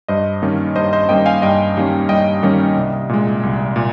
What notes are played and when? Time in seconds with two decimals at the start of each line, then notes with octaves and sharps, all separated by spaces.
0.08 G2 C5 D#5
0.42 D#3 G3 A#3 C#4
0.75 G2 C5 D#5
0.93 C5 D#5
1.09 D#3 G3 A#3 C#4 D#5 G5
1.26 F5 G#5
1.42 G2 D#5 G5
1.76 D#3 G3 A#3 C#4
2.09 G2 D#5 G5
2.43 D#3 G3 A#3 C#4
2.76 C2
3.09 A#2 G#3
3.43 C2
3.76 A#2